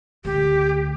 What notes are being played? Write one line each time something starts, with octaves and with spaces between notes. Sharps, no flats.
D2 C#3 G4